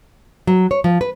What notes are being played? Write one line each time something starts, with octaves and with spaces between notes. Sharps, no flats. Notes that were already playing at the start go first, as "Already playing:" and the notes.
F#3
C#5
F3
B4